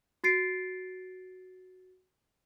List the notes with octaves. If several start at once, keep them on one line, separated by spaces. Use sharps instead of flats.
F#4 A6 C7 D7